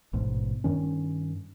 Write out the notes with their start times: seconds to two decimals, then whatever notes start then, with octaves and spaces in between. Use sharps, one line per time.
0.13 A1 G#2 B2
0.64 G2 D#3 C#4